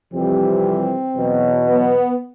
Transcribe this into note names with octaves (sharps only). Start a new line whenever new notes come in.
F2 C3 E3 G3 C4
E2 B2 F#3
B3